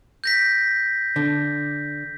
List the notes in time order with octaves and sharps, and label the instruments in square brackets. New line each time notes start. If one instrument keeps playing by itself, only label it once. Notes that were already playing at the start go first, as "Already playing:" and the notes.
[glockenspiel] G6 A#6 B6
[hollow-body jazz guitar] D3